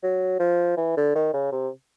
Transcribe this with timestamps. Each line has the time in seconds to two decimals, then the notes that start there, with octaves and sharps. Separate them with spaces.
0.03 F#3
0.40 F3
0.77 E3
0.97 D3
1.15 D#3
1.34 C#3
1.52 C3